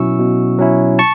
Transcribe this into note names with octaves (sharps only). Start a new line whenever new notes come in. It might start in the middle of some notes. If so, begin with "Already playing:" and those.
Already playing: B2 F#3 C#4 E4 C#6 E6
B2
F#3 C#4 E4
A5 C#6